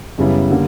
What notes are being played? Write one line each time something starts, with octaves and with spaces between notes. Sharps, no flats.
F#2 C#3 G3 B3 E4
D3 G3 A#3